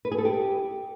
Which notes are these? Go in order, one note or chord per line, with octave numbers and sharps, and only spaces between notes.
B4
G#4
A4
G4